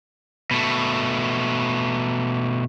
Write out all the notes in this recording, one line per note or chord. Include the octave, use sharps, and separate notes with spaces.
B2 A3